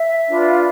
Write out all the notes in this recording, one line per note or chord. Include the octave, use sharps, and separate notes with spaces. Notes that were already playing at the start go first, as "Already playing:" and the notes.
Already playing: E5
D4 F4 B4